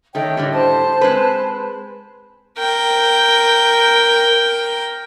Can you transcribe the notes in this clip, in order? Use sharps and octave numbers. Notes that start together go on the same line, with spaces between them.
D#3 A3 C#5 D#5 G5
A2 D3 G3
C5 A5
G#3 C4 B4
A#4 G5